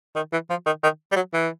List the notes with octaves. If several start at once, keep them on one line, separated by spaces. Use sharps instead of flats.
D#3
E3
F3
D#3
D#3
G3
F#3
E3